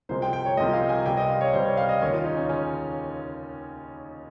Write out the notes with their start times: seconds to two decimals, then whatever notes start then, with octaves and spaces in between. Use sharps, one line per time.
0.09 C2 C3 F3 G#3 C5
0.22 G5
0.33 G5
0.45 C#5
0.57 C2 C3 F3 G#3 D#5
0.73 F5
0.89 G#5
1.06 C#2 C3 G3 G5
1.17 D#5
1.30 F5
1.41 C#5
1.53 C#2 C3 G3 C5
1.65 C#5
1.77 F5
1.89 D#5
2.01 D#2 C#3 G#3 C#5
2.13 F4
2.25 D#4
2.37 C#4
2.49 C#3 G#3 C#4